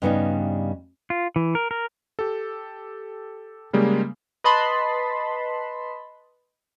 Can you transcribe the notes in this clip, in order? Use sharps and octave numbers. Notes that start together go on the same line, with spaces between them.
G2 C#3 G3 B3 D4 D#4
F4
E3
A#4
A#4
G4 A4
C#3 G3 G#3 A#3
B4 D#5 A5 B5 C6